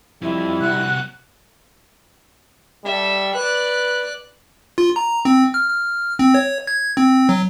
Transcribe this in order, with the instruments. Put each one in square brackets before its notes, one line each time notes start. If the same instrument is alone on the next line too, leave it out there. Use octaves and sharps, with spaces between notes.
[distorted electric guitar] F2 [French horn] G3 [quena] E4
[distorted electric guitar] C2 F#4 [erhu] F#6
[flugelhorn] G3 [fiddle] A4 E5
[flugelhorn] B4 [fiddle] D5 F#6
[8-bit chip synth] F4
A#5
C4
F6
F6
C4
C#5
G#6
C4
F#3